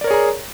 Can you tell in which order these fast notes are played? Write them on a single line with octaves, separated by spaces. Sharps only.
D5 A#4 C#5 G#4 A#5